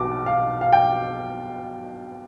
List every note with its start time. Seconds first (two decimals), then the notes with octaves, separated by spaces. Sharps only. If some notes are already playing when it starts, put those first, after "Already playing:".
Already playing: B1 B2 D6
0.26 F5
0.61 F5
0.73 G5